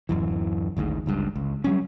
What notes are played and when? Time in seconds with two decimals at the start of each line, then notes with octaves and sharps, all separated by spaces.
0.09 D1 F#2 E3
0.77 G#1 D2 G#2 G#3
1.06 G1 C#2 G2
1.36 C#2
1.64 F#3 G3 C#4